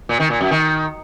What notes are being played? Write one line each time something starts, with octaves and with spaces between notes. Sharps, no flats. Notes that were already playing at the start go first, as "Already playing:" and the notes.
A#2
D#3
A#2
F#2
D#3